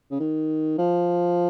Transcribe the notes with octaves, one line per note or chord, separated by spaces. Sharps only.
C#3
D#3
F3